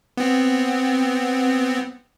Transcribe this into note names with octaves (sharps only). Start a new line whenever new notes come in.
B3 C4